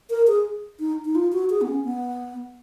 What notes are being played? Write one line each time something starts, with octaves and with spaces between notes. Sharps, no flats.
A#4
G#4
D#4
D#4
F4
F#4
G#4
B3
C#4
B3